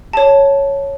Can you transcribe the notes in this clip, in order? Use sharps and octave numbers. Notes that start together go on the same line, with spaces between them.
C#5 A5